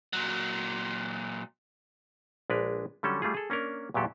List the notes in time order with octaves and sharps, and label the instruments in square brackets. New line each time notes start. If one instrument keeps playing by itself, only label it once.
[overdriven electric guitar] A#2 F#3
[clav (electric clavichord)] A#1 G#3 D4 A#4 B4
D3 F#3 G3 C#4 A4
G3 A3 F4 G#4
G#4 A4
A#3 C#4 D4 A#4
E2 A#2 F#3 G4 A4